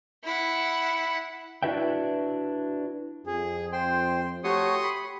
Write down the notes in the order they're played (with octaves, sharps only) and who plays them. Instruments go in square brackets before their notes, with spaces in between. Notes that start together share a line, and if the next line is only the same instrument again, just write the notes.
[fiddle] E4 F#5
[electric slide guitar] D4 E4 F#4 B4 E5 G5
[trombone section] F2 [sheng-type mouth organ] G#4
[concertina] C5 G5 [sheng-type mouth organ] C6
[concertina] A3 F#4 C#5 [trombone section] G4 [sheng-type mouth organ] C6 C#6 D#6
[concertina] B5